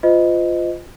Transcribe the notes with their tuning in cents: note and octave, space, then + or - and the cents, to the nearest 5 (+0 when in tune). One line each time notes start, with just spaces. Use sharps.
F4 +0 C5 -35 D#5 +0